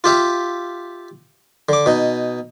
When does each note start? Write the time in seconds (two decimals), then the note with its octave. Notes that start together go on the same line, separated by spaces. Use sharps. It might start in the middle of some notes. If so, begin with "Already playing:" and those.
0.04 F4 G4 E5 F5
1.69 D3 D6
1.86 B2 D#4